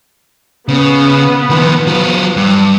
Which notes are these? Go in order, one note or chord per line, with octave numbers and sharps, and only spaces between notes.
C#3 B3
D#3 F3
F#3 F4
G2